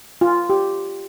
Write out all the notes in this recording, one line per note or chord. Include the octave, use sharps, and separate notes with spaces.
F4
G4